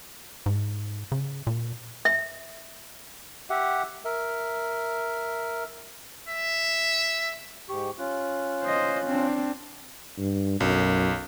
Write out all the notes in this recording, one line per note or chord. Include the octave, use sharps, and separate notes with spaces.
G#2
C#3
A#2
E5
G4 E5 F#5
A#4 E5
E5
G#2 G4 C#6
C#4 F4 F#6
C5 D#5
C4 D4
G2
B1 F#2